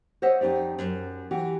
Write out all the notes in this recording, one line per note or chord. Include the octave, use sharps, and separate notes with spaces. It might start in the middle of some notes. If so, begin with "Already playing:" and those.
C5 C#5 D#5 E5 F#5
F2 D#4 G4 D5
F#2
E3 F#4 G4